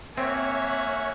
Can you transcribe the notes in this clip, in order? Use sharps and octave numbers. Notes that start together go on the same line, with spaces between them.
A#3 C4 C#5 E5 F#5 G#5